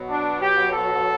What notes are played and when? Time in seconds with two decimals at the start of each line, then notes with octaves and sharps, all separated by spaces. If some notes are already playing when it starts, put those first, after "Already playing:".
Already playing: B2 F#3
0.10 D4
0.41 G4
0.72 A4